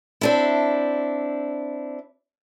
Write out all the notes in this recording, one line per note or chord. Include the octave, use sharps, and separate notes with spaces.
C4 D4 E4